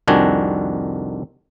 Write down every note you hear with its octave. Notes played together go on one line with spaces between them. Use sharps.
C2 F2 D#3 D4 F#4 G#5